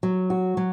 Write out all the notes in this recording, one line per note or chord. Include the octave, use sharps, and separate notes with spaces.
F#3
F#4
F#3